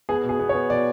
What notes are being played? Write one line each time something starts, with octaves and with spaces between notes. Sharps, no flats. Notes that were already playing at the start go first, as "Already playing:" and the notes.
B3 G#4
B2
G#4
B3
C#5
B3
B2 D5